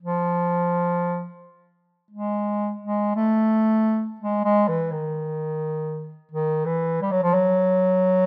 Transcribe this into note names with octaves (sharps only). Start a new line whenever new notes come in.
F3
G#3
G#3
A3
G#3
G#3
E3
D#3
D#3
E3
G3
F#3
F3
F#3